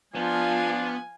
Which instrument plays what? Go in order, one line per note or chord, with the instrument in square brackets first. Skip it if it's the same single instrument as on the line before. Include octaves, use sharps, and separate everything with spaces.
[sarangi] F3 [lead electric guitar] B3 [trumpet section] D4 F4 [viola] G#5